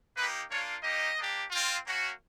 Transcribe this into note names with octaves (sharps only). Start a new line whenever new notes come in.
A#3 D#4 G4 B4
A#3 D4 F4 C#5
A#3 D#4 G4 D#5
A#3 D4 G4
C4 F4
A#3 C#4 F#4